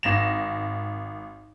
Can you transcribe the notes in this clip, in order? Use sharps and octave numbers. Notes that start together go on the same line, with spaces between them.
G#1 A#6 E7